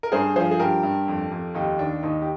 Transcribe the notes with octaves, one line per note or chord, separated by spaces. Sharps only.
A#4
G2 G#4 C5
F3 G#4 C5
G#4
G2 G4 A#4
G2
F2
F2
D#2 D#4 G4
D#3 D4
D#2 D#4
G4